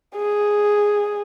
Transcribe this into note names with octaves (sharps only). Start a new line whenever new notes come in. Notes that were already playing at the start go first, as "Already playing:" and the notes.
G#4